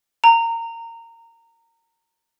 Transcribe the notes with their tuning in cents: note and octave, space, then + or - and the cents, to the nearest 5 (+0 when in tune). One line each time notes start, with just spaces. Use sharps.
A#5 -20